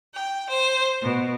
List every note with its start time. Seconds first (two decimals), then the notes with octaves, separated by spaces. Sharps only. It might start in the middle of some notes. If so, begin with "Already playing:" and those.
0.13 G5
0.49 C5
1.02 B2